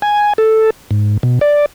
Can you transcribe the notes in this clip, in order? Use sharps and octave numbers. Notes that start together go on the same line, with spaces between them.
G#5
A4
G#2
B2
D5